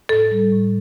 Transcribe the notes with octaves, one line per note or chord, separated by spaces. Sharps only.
A2 A4
G3
A2